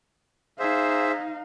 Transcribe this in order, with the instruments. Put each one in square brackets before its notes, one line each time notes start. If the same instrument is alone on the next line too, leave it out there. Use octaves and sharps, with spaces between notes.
[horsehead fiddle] D#4 F5 [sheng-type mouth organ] G#4 C5 E5